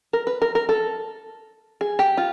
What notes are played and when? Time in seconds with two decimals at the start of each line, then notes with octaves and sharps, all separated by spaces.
0.13 A#4
0.27 B4
0.42 A#4
0.55 A#4
0.69 A4
1.81 G#4
1.99 G4
2.17 F4